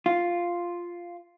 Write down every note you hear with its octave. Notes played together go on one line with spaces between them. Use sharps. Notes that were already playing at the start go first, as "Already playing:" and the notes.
F4